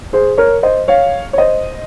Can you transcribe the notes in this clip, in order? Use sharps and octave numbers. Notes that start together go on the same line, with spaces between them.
G#4 C5
A#4 C#5
C5 D#5
C#5 F5
C#5
C5 D#5